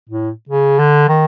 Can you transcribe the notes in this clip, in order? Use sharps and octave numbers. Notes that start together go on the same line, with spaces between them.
A2
C#3
D3
D#3